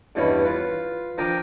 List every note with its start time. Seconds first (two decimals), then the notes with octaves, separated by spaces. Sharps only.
0.15 E2 G2 B2 C#4 E4
0.45 F4 B4
1.18 F3 D4 A#4 G5 A#5 D#6